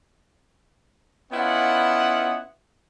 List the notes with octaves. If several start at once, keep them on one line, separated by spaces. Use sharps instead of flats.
B3 C#4 E4 F4 D#5 F#5